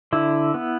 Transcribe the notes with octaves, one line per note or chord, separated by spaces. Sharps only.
D3 E4
B3